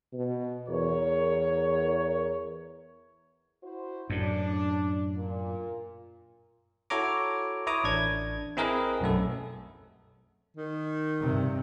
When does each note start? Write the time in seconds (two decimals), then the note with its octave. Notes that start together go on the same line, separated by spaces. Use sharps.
0.13 B2
0.69 E2 A#4 C#5
3.62 E4 F#4 C5
4.10 F#2 A2 D4
5.15 A#2
6.90 E4 F#4 A4 C#5 A#5 D6
7.67 E4 B4 C#5 A#5 D6 D#6
7.84 A1 D4 G#6
8.57 C4 E4 G#4 A#4 B4 D#5
9.01 B1 F#2 A3 A4
10.57 D#3
11.21 G2 C3